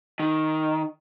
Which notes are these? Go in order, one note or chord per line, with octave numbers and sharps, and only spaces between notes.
D#3